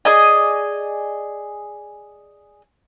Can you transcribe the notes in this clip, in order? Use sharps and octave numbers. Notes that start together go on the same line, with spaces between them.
G#4 D5 D#5 G#5